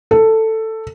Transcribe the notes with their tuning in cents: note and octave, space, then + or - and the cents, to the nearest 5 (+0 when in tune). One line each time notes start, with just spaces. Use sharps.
A4 +10